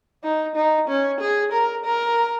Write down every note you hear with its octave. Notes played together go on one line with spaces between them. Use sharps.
D#4
D#4
C#4
G#4
A#4
A#4